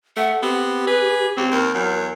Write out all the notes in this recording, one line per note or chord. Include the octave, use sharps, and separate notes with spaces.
A3 F#5
B3 C4 G4
G#4 B4
C#2 C4
D#2 A#4
E2 F#3